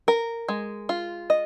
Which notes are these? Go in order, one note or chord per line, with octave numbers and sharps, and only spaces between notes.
A#4
G#3
F4
D#5